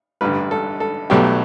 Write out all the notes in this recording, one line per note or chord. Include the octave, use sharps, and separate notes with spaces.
A1 G2 D3 B4
A4
A4
B1 B2 F#3 A3 G4